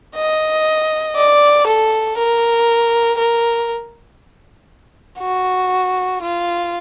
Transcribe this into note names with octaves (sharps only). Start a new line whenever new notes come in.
D#5
D5
A4
A#4
A#4
F#4
F4